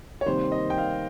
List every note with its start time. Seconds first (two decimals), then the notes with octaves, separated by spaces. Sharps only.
0.21 C#5
0.26 C3 D#3 G3 A#3 C5
0.52 D#5
0.70 G5
0.78 F5